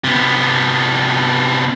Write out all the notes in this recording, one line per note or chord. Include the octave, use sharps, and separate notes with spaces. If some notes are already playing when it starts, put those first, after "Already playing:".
C3 B3